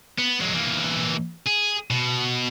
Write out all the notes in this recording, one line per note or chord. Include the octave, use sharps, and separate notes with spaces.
B3
F#3 G#3
E3 A#3
G#4
B2